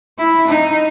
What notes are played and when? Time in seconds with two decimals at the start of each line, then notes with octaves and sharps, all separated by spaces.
0.18 E4
0.47 D#4